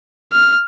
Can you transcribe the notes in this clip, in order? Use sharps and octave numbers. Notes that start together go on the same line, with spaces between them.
F6